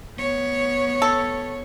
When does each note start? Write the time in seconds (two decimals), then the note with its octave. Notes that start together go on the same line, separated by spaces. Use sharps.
0.18 B3 C#5
1.02 A4